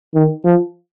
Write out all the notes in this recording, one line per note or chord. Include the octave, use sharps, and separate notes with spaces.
D#3
F3